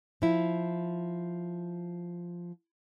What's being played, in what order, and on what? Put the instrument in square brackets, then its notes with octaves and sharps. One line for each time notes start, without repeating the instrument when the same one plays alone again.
[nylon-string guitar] F3 E4